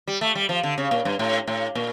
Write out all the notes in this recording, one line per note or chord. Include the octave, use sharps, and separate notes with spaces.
G3
A3
G3
F3
D3
C#3
A#2
G2
A2
A2
A#2